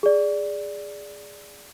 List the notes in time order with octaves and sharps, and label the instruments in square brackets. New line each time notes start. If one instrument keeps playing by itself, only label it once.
[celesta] G#4 D5